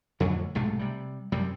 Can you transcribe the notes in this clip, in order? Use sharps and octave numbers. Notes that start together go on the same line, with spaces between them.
F2 A2 D3 F#3
B1 G#2 C3 A3
C3 G3
F#2 C3 G3